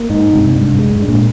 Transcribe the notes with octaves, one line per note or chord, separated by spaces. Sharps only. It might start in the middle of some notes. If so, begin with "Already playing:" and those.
Already playing: A#3
G#2 D#4
G2 C3
G#2 D4
G2
G#3
G#2
D4
A#2